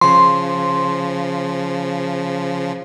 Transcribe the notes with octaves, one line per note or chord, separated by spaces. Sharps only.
C#3 F3 C6